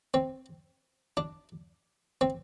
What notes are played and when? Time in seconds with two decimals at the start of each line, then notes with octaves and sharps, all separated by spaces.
0.14 C4
1.17 D4
2.21 C4